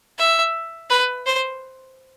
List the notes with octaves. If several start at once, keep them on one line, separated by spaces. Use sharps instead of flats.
E5
B4
C5